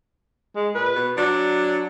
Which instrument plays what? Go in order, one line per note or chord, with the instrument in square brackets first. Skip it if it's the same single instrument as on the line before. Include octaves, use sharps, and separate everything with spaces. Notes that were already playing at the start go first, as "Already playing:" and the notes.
[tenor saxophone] G#3
[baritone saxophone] A#2 [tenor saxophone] B4
[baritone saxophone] B2
[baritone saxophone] F#3 [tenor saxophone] D4